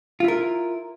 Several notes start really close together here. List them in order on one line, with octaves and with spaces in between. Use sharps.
F4 E4 A#4